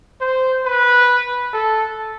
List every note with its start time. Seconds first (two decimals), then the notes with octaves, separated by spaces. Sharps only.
0.21 C5
0.65 B4
1.53 A4